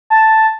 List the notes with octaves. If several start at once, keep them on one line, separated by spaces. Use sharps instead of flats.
A5